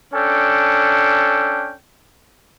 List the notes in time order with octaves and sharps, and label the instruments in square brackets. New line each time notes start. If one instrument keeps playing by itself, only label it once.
[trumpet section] C#4 D4 A4 G5